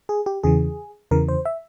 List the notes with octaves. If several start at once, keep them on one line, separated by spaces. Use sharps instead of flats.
G#4
G4
E2 C#3 E3 G#4
E2 C#3 E3 A#4
C5
E5